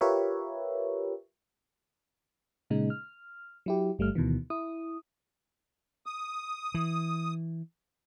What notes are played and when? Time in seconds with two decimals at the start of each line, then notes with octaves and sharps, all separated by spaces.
0.01 F4 G4 A#4 B4 C#5 E5
2.70 A#2 C#3 G#3 D#4
2.90 F6
3.66 F#3 E4 G4
3.99 G1 G3 A3 F6
4.15 D2 B2 D#3 E3
4.50 E4 D#6
6.06 D#6
6.74 E3